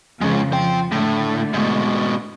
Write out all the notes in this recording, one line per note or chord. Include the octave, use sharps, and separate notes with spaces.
F2 C#3 F3 G#3 C#4
F3 C5 G5
A2 D3 A3
G#2 B2